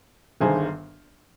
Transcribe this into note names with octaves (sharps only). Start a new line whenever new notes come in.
G1 G2 D#3 G#4 C5